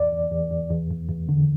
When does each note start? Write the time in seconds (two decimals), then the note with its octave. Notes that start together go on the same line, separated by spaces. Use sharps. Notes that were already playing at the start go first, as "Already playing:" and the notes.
Already playing: E2 D5
0.12 E2
0.31 E2
0.51 E2
0.70 E2
0.91 E2
1.09 E2
1.29 D3